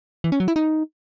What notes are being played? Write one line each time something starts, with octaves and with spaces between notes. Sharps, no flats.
E3
C#4
F#3
E4
D#4